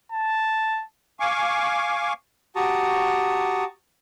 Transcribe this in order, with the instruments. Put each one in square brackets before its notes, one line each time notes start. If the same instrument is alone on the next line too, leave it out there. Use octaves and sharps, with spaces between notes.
[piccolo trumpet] A5
[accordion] F5 G#5 C#6 D6
[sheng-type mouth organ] F#4 G4 A5 A#5 C#6 D#6